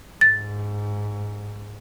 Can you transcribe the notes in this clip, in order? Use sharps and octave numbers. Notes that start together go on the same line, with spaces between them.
G#2 A6